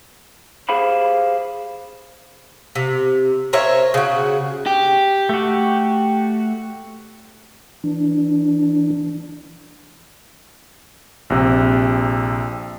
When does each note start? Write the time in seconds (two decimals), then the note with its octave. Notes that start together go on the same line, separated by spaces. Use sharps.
0.69 G4 G#4 C5 F5 B5
2.75 C3
3.53 A#4 C5 C#5 E5
3.94 C#3 F#4
4.66 G4
5.29 A3 F#4
7.84 E3 D4
11.30 A#1 C3